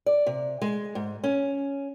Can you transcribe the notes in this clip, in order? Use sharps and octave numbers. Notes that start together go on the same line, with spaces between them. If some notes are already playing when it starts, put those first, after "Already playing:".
D5
C3
G#3
G#2
C#4